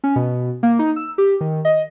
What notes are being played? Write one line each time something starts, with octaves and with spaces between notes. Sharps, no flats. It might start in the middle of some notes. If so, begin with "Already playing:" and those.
C#4
B2
A#3
D#4
E6
G4
D#3
D#5